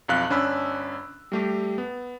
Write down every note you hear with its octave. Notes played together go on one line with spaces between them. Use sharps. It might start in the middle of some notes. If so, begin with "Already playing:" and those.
B1 F2 F5 F#6
G1 C#4 D4 B5 E6
G3 A3 G4
B3